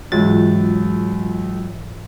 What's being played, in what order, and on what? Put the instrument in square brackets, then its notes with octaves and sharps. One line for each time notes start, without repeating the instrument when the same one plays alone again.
[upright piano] C#2 [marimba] G#2 E3 F4 [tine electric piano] F#3 A6